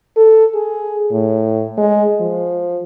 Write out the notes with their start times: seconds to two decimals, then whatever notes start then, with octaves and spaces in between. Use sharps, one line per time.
0.17 A4
0.55 G#4
1.11 A2
1.78 G#3
2.20 F3